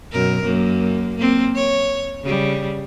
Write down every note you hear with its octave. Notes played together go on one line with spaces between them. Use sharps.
F#2 B2 A#4
F#2 A#3
A#3 C4
C#5
C#3 G3